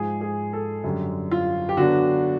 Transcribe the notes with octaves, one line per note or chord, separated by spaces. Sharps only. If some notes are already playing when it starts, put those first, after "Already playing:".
Already playing: G#2 F3 G#3 G#4
G#4
A4
F#2 D3 G3
F4
G4
D3 F#3 B3 D4 F#4